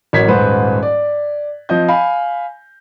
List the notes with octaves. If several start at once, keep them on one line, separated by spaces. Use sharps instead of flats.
A1 F#3 A#4 G#6 B6
D#1 G#2 B4 C5
D5
F3 C4 D#5 G6
F5 G#5 B5